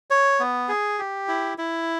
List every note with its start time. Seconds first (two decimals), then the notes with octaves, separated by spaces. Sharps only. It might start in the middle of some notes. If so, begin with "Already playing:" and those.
0.10 C#5
0.40 B3
0.69 G#4
0.99 G4
1.28 E4
1.58 E4